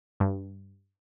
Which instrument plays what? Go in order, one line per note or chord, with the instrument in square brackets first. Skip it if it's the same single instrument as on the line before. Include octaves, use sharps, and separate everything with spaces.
[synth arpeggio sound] G2